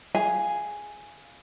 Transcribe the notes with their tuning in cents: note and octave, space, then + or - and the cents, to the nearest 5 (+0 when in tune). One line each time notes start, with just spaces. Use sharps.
G#4 +0 F5 +0 G#5 +0